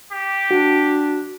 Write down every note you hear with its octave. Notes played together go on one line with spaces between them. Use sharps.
G4
D4 F#4